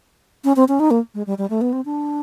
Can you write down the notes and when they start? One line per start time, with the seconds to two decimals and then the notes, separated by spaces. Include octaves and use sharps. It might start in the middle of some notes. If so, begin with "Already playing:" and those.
0.45 C#4
0.56 C4
0.68 C#4
0.80 D#4
0.91 A#3
1.15 G#3
1.27 G3
1.38 G3
1.50 A3
1.61 B3
1.73 C4
1.85 D4